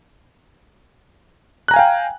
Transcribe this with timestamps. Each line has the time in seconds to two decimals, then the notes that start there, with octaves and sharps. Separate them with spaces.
1.68 F#6
1.71 A#5
1.74 G#5
1.76 F5
1.79 G5